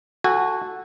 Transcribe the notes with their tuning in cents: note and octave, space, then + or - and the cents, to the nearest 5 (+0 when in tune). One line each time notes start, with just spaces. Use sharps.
F#4 +0 A4 +0 G#5 -30